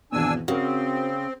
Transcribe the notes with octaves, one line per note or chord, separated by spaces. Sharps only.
G#1 E2 B2 D4 G#5 E6
C#3 C4 F#4 A#4